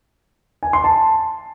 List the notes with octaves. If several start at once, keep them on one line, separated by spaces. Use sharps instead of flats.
G#5
C6
A5